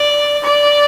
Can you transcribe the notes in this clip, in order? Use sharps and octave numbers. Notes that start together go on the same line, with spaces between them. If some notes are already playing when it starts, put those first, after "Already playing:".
Already playing: D5
D5